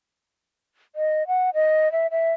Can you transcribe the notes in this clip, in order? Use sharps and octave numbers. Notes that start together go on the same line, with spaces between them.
D#5
F#5
D#5
E5
E5